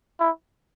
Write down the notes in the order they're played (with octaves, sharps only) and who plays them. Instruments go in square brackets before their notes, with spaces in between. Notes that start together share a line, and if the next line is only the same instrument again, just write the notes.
[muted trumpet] E4